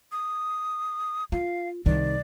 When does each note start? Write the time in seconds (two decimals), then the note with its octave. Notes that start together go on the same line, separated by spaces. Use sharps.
0.12 D#6
1.32 F4 F5
1.86 C2 D#3 D5